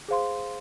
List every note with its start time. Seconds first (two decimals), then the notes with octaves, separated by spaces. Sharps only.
0.08 G#4 C5 F5 C6